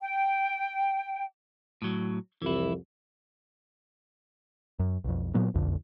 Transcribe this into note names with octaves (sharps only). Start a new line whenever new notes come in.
G5
A2 F#3
C2 F2 E3 E4
F#2
B1 F2
A#2 F#3 B3
F#1 B1 F2 D3